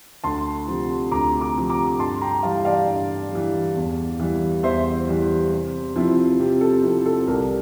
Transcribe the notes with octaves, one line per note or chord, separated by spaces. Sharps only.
D2 A5 C6
C3 F3
D2 A#5 D6
A#5 D6
C3 F3
A#5 D6
G2 A5 C6
G5 A#5
E3 G3 F5 A5
D5 F5
G2
E3 G3
E2
E3 G3
E2 C5 E5
E3 G3
C3
F3 C4 E4
C3 G4
A4
F3 C4 E4
A4
C2 G4 A#4